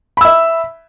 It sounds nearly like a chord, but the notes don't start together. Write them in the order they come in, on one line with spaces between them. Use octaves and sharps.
B5 E6 E5